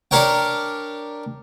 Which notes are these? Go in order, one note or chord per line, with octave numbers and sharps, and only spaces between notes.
D4 G4 A#4 C#5 G5